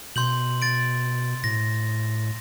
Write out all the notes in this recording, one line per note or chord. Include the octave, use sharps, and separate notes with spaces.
B2 C6 G6 F#7
A6 D7
A2 A#6